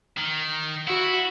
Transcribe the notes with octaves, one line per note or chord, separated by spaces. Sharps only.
D#3
E4 F#4